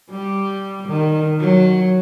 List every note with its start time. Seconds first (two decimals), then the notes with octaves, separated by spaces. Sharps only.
0.10 G3
0.88 D#3
1.40 F#3